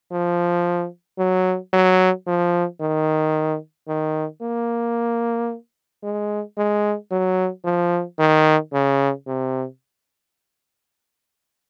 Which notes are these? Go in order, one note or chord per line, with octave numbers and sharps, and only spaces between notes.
F3
F#3
F#3
F3
D#3
D#3
A#3
G#3
G#3
F#3
F3
D#3
C#3
C3